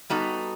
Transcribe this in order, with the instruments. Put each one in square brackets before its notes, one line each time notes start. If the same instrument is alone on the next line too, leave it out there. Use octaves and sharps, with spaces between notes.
[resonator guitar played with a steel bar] G3 B3 D#4 F#4 A4